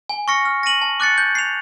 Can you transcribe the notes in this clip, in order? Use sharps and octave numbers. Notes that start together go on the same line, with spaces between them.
G#5
C#6 F6 A#6 C#7
F6
A#6 D#7 F#7
A5
D6 F#6 A6 C#7
G6
C7 F7